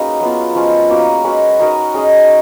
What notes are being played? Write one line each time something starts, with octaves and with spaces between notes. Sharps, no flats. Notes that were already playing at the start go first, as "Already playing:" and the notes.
Already playing: A#3 C#4 D#4 F#4 G#4 B4 C#5 D#5
F#3 B3 F4
F3 G#3 C#4 F4
A#3 C#4 F#4
G#3 C#4 F#4 B4
D#4 F#4 A#4 D#5
C#4 G#4 D#5